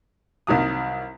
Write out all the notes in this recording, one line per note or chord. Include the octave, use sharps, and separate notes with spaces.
C2 D#3 F#3 D#6